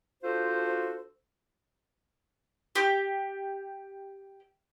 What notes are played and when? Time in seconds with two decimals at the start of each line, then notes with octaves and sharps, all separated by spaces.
0.23 D4 F4 F#4 A4 C5
2.75 G4 D6